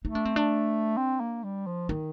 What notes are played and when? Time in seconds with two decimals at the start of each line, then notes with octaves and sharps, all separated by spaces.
0.05 A3 D#4
0.15 D4
0.25 C4
0.36 D4
0.97 C4
1.20 A#3
1.44 G3
1.66 F3
1.89 D#3 D#4